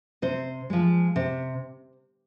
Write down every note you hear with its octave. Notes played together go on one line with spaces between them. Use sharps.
C3 C5
F3 G#3
C3